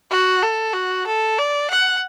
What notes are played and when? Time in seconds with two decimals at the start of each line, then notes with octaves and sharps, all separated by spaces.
0.11 F#4
0.42 A4
0.74 F#4
1.07 A4
1.38 D5
1.70 F#5